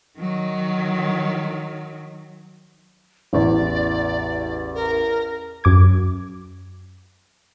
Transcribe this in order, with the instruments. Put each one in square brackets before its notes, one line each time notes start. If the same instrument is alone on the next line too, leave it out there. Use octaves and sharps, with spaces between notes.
[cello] D#3 F#3
[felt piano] A1 E2 [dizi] D5
[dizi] A#4
[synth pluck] F#2 D6 G#6